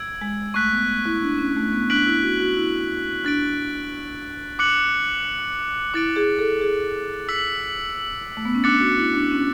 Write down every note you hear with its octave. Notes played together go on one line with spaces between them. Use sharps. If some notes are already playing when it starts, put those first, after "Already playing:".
Already playing: E6 G#6 D7
G#3
A3 C#6 F#6 B6
B3
A3
E4
D4
C#4
A3
B3
D4 F#6 B6 D7 F#7
E4
F#4
F#4
E4
D4 F#6 A6 D7
D6 F#6 C#7 F#7
E4 D6 A6 D7
G#4
A4
G#4
E6 B6 F#7
A3
B3
C#4
D4 D6 F#6 A6 C#7
F#4
E4
D4
C#4